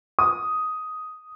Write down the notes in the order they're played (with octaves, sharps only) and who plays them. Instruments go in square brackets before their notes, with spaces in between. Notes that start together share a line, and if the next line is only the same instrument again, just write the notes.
[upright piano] D#6